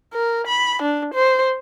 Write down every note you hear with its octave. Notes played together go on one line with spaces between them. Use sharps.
A#4
B5
D4
C5